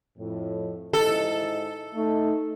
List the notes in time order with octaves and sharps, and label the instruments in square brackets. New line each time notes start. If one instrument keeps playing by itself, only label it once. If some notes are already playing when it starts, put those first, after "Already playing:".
[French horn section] F2 A2
[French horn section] G#2 E4 D#5 [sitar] A4
[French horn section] A3 D#4